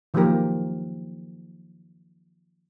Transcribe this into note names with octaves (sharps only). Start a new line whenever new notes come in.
D#3 F3 F#3 A#3 G4 A#4